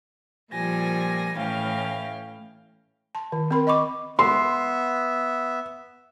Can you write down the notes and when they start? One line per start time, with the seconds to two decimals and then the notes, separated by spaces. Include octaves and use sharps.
0.53 A#2 F3 G3 G#5 A#6
1.37 A2 E3 C#4 F5 G5
3.15 A5 C6
3.32 D#3
3.51 C4 A#4 B5 C6
3.67 D#5 B5 C#6 D6
4.19 B3 E5 C6